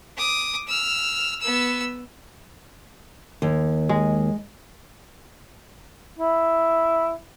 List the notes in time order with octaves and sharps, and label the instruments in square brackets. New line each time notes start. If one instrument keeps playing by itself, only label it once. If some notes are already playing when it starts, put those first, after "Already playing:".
[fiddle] D6 D#6
E6 F6
B3 E6
[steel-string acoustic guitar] D#2
[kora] G#3
[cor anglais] E4